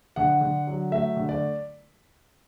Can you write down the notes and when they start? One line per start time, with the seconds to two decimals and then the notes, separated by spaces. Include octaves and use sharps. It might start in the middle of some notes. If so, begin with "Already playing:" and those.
0.16 D3 F#5
0.41 D3
0.67 F#3
0.91 A3 E5
1.17 D3
1.29 D5